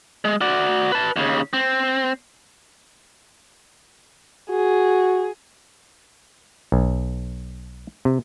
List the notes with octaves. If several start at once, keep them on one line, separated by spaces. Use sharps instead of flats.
G#3
F#4 D5
B4 A5
D#2 C#3
C4
F#4 G#4
B1
C3